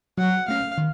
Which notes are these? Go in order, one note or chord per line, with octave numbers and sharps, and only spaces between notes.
F#3 F#5
A3 C#4 F5
D#3